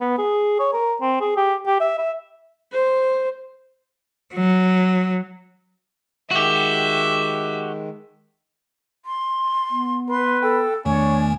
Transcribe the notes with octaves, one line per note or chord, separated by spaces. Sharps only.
B3
G#4
C#5
A#4
C4
G#4
G4
G4
E5
E5
C5
F#3
D#3 G#3 F#4 G4 E5
C6
B3
B4 C6
A4 G5
E2 D#3 A3 D4 C#5 G#5